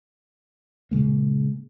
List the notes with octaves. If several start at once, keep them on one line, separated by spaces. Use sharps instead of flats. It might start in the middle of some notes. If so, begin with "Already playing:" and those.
A#2 C#3 G#3 A#3